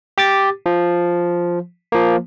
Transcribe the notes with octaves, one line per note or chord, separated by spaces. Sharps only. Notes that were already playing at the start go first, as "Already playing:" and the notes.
G4 D6 A6
F3
F3 A#3